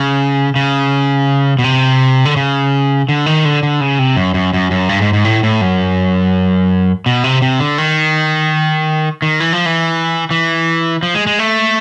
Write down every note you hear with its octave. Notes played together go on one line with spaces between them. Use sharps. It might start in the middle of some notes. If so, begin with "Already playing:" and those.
Already playing: C#3
C#3
B2
C3
D3
C#3
D3
D#3
D3
D3
C#3
C3
F#2
F#2
F#2
F#2
G2
G#2
G#2
A2
A2
F#2
B2
C3
C3
D3
D#3
D#3
E3
F3
E3
E3
F3
G#3
G#3
A3